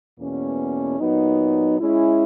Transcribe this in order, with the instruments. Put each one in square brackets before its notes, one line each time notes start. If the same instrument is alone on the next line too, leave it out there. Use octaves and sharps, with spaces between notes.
[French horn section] E2 B2 A#3 C#4
A#2 F#3 B3 D#4
G#3 C#4 E4